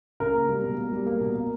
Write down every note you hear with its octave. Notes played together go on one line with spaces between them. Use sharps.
C#3 A#4
A#3
G3
B2
A#3
G3
A#3
B2
A#3